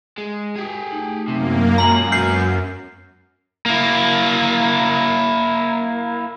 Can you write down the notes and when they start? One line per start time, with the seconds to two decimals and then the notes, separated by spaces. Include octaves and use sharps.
0.18 G#3
0.56 G4 G#4
0.92 A3 D#4
1.28 F#2 C3 A#3
1.78 B1 F#2 A#2 G#3 G#5 A#5 F#7
2.12 B3 F#4 F6 G6 C7
3.66 A#3 E4